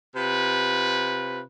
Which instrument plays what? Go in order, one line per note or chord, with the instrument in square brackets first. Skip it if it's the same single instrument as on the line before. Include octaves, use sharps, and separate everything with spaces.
[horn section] C3 F4 B4